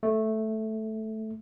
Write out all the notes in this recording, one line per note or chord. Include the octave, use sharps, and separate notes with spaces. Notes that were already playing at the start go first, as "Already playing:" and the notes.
A3